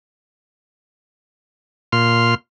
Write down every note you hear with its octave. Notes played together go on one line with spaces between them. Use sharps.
A#2 C6 F6